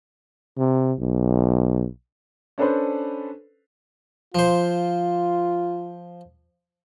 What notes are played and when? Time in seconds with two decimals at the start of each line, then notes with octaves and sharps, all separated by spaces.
0.58 C3
0.99 B1
2.58 C#4 D4 A4 B4 C5
4.35 F3 F4 C5